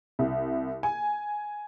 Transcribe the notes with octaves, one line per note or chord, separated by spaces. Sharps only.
C2
G#5